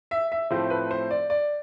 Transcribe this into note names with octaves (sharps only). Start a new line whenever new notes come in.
E5
E5
A2 F3 A3 C4 C5
B4
C5
D5
D5